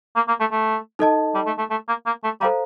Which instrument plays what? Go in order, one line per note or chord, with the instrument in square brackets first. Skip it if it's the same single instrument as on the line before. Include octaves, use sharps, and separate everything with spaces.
[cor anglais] A#3
A#3
A3
A3
[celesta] D#4 A4 D#5 A5
[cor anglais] G3
A3
A3
A3
A#3
A#3
A3
[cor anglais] G3 [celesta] A4 C5 F5 A#5